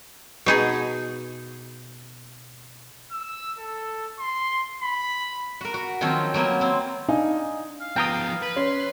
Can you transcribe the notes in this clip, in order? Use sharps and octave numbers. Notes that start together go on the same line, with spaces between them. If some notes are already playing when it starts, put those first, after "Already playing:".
B2 D#4 G#4
E6
A4
C6
B5
F#4 A#4
F#4
D#3 F3 F#3 C4 C#4
F#3 A#3 B3 C#4
A#3 C4
D4 D#4 D#5 F5 G#5
F5
F3 B3 G5 A#5 D#6
B4
C#4 C6